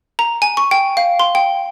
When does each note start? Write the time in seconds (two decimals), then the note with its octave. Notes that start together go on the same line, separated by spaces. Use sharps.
0.19 A#5
0.42 G#5
0.57 C#6
0.71 G5
0.97 F5
1.19 C6
1.35 G5